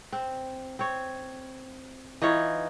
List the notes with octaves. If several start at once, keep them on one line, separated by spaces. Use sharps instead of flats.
C4
C4 C#5
E3 D#4 F4 C#5